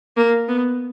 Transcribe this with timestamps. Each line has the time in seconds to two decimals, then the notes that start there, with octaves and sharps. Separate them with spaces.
0.17 A#3
0.48 B3